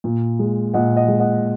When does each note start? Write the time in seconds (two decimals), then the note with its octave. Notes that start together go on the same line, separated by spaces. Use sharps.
0.04 A#2
0.39 G#3
0.74 A#2 D#5 F#5
0.96 D#5 F#5
1.08 G#3
1.20 D#5 F#5